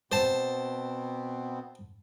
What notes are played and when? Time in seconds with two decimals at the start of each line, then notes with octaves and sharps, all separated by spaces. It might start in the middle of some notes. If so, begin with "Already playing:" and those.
0.12 B2 B3 C4 C5 A5